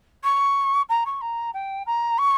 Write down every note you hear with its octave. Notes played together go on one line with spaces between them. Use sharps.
C#6
A#5
C#6
A#5
G5
A#5
C#6